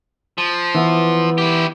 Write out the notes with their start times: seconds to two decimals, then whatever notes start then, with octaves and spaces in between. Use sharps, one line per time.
0.38 F3
0.75 E3 B3
1.38 E4 G4